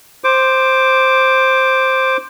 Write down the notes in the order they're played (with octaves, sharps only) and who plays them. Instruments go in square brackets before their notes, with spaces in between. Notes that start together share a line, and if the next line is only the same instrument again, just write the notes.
[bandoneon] C5 D6